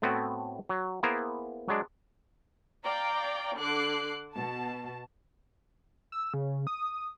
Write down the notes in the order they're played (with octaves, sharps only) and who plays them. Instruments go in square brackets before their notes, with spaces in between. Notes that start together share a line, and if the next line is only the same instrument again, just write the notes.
[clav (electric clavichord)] A2 A3 B3 C4 E4 F#4
F#3
A#3 B3 E4 G#4 A#4 C5
F#3 G#3 D4
[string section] D5 F5 G5 A#5
D3 D6 F#6 C7
B2 A5
[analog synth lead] E6
C#3
D#6